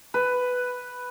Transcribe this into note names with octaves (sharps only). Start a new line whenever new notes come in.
B4